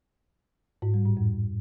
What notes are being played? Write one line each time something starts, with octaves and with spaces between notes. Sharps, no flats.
G#2
G3
A2
F2